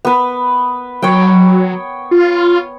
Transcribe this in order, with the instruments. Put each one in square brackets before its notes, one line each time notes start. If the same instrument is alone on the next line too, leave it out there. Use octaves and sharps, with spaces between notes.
[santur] B3 B4
[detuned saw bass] F#3 [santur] C#5 G5
[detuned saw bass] F4